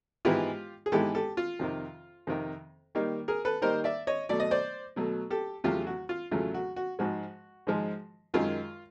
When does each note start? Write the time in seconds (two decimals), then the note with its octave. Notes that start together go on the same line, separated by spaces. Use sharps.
0.25 G#2 E3 G#3 B3 E4 F4 G4
0.86 G#4
0.92 G#2 E3 G#3 B3 E4 G4 A4
1.15 G4 A4
1.37 F4
1.59 F2 C3 D#3
2.27 F2 C3 D#3
2.95 D#3 G3 A#3 D#4
3.28 G#4 A#4
3.45 A4 B4
3.62 D#3 G3 A#3 D#4 A#4 C5
3.84 D5 E5
4.07 C#5 D#5
4.29 B2 F#3 A3 D5
4.40 D#5
4.51 C5 D5
4.96 B2 F#3 A3
5.30 G4 A4
5.64 E2 C#3 F#3 A3 F4 G4
5.87 F#4
6.09 F4
6.31 E2 C#3 F#3 A3 F4
6.54 F#4
6.76 F#4
6.99 G#2 F3 G#3 F#4
7.67 G#2 F3 G#3
8.34 F#2 D#3 G#3 F4